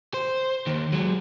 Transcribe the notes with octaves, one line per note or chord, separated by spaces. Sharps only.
C5
D#2 D#3
F#3 G#3